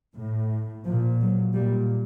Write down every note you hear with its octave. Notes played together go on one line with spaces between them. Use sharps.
A2
A#2 F3
F#3
A#2 G3